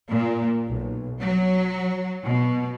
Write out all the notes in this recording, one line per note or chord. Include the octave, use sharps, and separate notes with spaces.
A#2
B1
F#3
B2